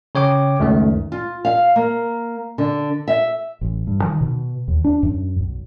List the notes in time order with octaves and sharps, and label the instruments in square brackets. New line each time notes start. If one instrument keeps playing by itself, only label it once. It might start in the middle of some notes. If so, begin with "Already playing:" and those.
[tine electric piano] C#3 C#5 G5 D6
C#2 F#2 D#3 A3
[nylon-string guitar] F4
F5
A#3
D3
E5
[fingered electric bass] A1
G2
D#3
B2
D#2
D4
F#2
B1